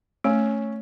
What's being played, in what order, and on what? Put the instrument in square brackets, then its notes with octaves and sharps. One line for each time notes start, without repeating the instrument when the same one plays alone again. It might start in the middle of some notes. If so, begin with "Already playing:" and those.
[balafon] A3 [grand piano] C#4